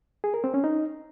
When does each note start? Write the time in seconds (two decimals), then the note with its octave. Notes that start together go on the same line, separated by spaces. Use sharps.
0.24 G#4
0.34 A#4
0.44 C4
0.54 C#4
0.64 D#4